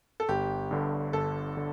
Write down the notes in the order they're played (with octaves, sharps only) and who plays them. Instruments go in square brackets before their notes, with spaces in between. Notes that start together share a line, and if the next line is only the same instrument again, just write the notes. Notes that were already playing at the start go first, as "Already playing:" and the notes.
[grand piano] A4
[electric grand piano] G1 [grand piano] G4
[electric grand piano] G2 D3
[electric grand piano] G1 [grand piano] A4
[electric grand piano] D3